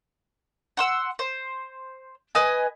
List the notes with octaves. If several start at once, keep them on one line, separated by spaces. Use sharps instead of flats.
F#5 C6 E6
C5
B4 D#5 G#5